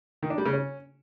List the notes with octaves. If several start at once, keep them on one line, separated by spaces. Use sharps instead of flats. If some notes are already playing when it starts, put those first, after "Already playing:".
D#3
D4
G3
C#3
C#4